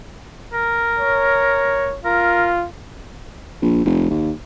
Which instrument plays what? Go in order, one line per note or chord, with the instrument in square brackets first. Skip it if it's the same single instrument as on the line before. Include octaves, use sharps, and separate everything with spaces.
[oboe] A#4
[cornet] C#5
[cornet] F4 [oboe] A#4
[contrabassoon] A#1
F1
D#2